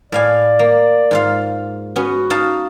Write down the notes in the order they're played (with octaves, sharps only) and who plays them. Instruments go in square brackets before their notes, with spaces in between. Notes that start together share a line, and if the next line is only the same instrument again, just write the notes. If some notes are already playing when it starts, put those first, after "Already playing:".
[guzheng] A2 F5 G#5 [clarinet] D5
[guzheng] A#3
G#2 F4 F5
[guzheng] B3 C#4 [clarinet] F#4
[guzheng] D#4 F5 A5